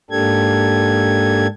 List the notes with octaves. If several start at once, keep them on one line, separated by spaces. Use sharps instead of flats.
G#2 A#3 D4 G4 A4 G#6